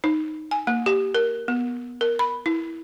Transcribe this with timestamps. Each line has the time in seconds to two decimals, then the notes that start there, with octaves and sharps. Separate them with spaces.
0.04 D#4
0.51 G#5
0.67 A#3
0.86 G4
1.15 A#4
1.48 B3
2.01 A#4
2.19 B5
2.46 E4